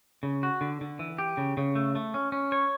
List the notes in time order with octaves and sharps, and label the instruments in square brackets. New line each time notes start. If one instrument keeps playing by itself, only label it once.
[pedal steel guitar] C#3
F#4
D3
D3
E3
G4
C#3
C#3
A3
A3
C#4
C#4
C#5